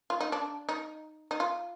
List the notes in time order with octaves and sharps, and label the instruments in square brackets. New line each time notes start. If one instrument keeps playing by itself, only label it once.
[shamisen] F4
D#4
D4
D#4
D#4
F4